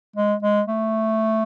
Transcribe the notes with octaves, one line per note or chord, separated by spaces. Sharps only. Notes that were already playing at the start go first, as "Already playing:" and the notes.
G#3
G#3
A3